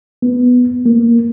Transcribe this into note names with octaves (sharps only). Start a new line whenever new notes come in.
B3
A#3